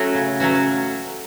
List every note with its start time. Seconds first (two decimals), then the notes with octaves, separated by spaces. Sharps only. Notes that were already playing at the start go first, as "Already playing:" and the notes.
Already playing: F#3 A3 C#4 F#4
0.15 C#3
0.40 F#3 A3 C#4 F#4